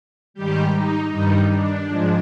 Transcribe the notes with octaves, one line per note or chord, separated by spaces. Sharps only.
G#2 D#3 G3 G4
D#4
G2 D#3 G3 D#4
D4
G#2 F3 G#3